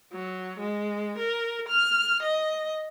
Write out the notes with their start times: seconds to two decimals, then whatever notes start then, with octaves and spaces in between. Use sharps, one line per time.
0.11 F#3
0.58 G#3
1.17 A#4
1.68 F6
2.23 D#5